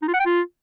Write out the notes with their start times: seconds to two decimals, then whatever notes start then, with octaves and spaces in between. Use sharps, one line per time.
0.02 D#4
0.08 F4
0.14 F#5
0.20 G5
0.26 F4